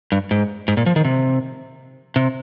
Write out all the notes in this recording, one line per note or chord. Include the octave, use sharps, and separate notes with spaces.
G2
G#2
G#2
A#2
F3
D#3
C3
C3